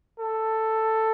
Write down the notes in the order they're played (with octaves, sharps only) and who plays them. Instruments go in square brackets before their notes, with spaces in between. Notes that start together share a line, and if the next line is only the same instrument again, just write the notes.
[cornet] A4